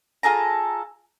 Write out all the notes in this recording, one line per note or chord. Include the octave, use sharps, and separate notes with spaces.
F4 G#4 A4 A#5